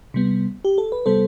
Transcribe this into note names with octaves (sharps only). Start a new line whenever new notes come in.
C3 G3 B3
G4
A4
B4
C3 G3 B3 A4 C5